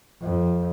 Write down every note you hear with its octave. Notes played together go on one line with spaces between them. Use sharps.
F2